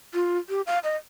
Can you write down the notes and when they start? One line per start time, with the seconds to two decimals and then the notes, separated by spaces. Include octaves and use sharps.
0.14 F4
0.49 G4
0.67 F5
0.84 D#5